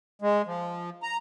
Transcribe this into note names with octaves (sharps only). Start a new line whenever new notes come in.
G#3
F3
A#5